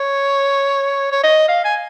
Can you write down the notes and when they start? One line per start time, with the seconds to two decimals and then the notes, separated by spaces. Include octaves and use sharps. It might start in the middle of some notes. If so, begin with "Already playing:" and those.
Already playing: C#5
1.12 C#5
1.23 D#5
1.49 F5
1.65 G#5